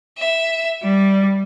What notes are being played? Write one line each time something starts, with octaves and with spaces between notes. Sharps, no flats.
E5
G3